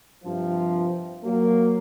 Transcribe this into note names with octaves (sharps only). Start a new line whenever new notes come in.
G2 C3 F3
F#3 A#3